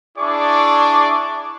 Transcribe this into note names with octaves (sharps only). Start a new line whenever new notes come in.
D4 E4 G#4 D5 C#6 D6